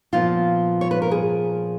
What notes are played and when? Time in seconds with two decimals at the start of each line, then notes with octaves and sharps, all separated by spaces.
0.12 A#2 F3 B3 F4
0.81 C#5
0.91 B4
1.02 A#4
1.11 G#4